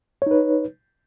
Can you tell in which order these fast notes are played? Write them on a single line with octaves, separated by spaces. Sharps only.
C#5 D#4 B4